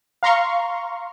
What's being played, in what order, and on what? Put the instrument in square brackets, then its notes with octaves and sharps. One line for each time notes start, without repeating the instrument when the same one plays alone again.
[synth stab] F5 A#5 C6 C#6